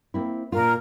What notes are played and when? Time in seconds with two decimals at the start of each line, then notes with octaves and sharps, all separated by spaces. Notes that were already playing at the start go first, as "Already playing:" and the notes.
0.14 A#3 C4 E4
0.52 A#2 F4 A#4